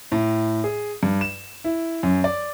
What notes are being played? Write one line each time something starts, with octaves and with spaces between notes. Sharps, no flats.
A2
G#4
G2
E7
E4
F#2
D5